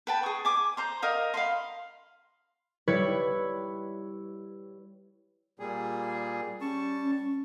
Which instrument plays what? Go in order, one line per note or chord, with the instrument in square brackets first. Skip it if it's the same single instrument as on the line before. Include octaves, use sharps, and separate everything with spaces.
[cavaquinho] B4 G5 A5
G#4 C#6
G#5 D6
C5 A#5 C6
A#4 D#5 F5
F5 B5 C6
[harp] G3 E4 B4 C#5 G#6
[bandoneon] A#2 G3 G#4
[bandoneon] G3 A5 C#6 [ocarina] C#4